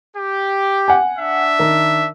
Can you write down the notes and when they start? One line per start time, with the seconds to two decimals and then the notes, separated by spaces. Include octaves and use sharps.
0.15 G4
0.88 F#5 G#5
1.18 D4 E5
1.59 D#3 A#4